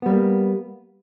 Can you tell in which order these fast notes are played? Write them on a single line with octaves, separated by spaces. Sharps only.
B3 G3 A#3